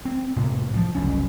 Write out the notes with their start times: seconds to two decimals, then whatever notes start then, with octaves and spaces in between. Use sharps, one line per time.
0.05 C4
0.36 A2 C3 A#3
0.73 D2 F3
0.95 F#1 C2 C#4